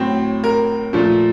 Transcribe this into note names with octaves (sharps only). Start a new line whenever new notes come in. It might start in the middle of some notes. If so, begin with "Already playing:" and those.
Already playing: A2 F#3 C4
A#4
A#2 F3 A3